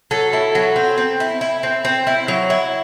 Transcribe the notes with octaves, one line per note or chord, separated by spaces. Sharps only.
F#3 A4
E4
F#3
C4
C4
E4
E4
C4
C4
E4
F#3
E4